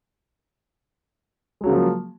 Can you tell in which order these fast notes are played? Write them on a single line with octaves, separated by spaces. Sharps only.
G#3 F#3 C#3 A#3 F3